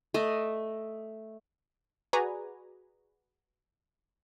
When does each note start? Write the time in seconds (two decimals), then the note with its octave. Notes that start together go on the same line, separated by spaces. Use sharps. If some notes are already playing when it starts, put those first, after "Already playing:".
0.14 A3 D#5
2.13 F#4 G#4 B4 D5 G#5 A#5